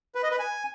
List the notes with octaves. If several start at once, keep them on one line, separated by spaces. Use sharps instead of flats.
B4
D#5
B4
G#5